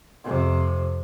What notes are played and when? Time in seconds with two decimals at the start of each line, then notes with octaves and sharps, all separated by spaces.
0.24 F2 C3